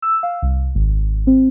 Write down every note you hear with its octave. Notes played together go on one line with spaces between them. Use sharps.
E6
F5
C2
G#1
C4